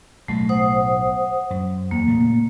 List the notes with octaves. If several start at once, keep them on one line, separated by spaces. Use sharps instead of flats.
B1 A2 A3
C5 F#5 D#6
F#2
E2 A#3
A#2 C#3 A3